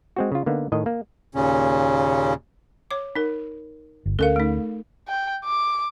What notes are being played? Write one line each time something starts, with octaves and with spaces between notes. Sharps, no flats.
G#3 C4 F#4
C#3 F4
D3 A#3 B3 D#4
A2 D#3 D#5
A#3
D#2 A#2 C#3 C#4
C#5 D6
D#4 A#4
G1
D2 C#4 A4 A#4 F5
A3 D#4
G5
D6